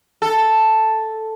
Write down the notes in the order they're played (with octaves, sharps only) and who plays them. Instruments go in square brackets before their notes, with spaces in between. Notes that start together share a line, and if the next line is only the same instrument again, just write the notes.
[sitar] A4